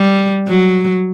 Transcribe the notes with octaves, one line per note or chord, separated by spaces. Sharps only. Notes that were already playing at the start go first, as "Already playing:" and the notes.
Already playing: G3
F#3